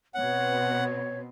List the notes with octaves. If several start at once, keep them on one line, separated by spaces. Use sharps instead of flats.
B2 B3 C4 C#5 F#5